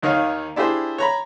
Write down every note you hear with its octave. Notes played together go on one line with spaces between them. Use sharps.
D#2 D#3 C#5 F5
D4 E4 G4 G#4 C5
C#5 A#5 B5